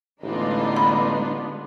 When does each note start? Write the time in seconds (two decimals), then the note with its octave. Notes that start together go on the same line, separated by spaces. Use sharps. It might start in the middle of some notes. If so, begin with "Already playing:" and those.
0.23 A1 D3 G#3 B3 D4 D#4 F4
0.77 B5